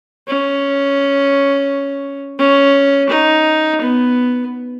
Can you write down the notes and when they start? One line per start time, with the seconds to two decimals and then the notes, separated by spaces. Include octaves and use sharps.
0.28 C#4
2.39 C#4
3.10 D#4
3.81 B3